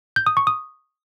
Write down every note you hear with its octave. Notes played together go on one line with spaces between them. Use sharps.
G6
D#6
C#6
D#6